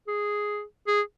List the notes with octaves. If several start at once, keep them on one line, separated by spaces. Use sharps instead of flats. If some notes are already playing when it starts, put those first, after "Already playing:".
G#4
G#4